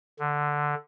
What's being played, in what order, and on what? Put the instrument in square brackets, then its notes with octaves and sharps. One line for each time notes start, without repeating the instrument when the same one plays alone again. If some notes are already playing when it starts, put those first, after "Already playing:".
[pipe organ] D3